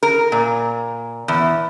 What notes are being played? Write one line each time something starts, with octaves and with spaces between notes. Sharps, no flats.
A#4
A#2
E2